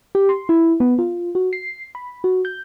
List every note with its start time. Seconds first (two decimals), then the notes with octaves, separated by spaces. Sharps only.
0.15 G4
0.29 C6
0.49 E4
0.80 B3
0.99 F4
1.35 F#4
1.53 C7
1.95 B5
2.24 F#4
2.45 G6